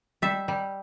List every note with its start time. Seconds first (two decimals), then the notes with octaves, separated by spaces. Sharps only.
0.22 G3 E5
0.48 G3